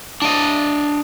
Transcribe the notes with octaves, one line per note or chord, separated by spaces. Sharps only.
D4 D#5